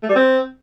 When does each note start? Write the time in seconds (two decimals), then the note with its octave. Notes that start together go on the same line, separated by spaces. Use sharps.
0.03 A3
0.09 G3
0.15 C4